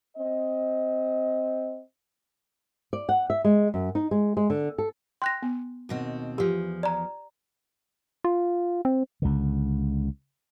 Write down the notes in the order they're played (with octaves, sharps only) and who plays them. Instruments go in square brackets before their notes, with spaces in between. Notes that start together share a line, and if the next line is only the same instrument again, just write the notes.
[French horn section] C4 D#5
[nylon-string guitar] D5
F#5
E5
G#3
F#2
D#4
G#3
G#3
D3
A4
[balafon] G5 [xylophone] C6 F#6 A#6
[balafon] B3
[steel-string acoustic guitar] D#2 B2 C4
[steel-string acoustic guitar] E2 F3 [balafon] G4
[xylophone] D5 A#5
[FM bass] F4
C4
[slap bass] C#2 D3